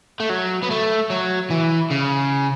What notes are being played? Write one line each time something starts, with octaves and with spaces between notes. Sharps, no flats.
A3
F#3
B3
A3
F#3
E3
C#3